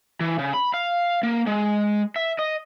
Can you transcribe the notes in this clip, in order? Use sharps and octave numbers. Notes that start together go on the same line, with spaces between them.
E3
C#3
B5
F5
A#3
G#3
E5
D#5